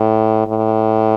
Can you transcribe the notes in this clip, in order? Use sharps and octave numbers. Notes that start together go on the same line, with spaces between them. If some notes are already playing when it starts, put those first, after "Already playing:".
Already playing: A2
A2